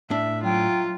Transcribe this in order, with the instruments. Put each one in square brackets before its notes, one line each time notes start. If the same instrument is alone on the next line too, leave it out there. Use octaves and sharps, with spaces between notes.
[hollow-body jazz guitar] A2 D4 [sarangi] E5
[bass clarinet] F#3 [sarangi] F4 [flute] G5